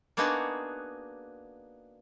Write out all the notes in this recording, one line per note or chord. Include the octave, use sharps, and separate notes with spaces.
A#3 B3 D4 D#4 F#4 G#4